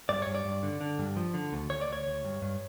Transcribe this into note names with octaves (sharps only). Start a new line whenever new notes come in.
G2 D5
G2 C#5
D5
G2
D3
D3
G2
F3
D3
D2
D2 C#5
D5
D2 C#5
D2
G2
G2